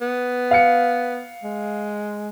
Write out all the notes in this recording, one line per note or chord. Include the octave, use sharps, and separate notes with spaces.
B3
F5 C#7
G#3